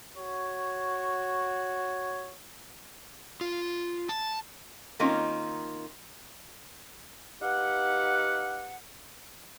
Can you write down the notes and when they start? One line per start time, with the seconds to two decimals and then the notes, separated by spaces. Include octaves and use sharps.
0.17 F#4 C#5
3.41 F4
4.09 A5
4.99 D#3 A#3 C4 C#4 D#4 F4
7.42 D#4 G4 B4 F5 F#5